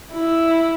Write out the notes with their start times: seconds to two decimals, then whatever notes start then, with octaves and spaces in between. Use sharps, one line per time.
0.13 E4